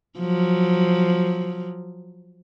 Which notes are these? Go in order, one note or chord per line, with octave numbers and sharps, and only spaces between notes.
F3 F#3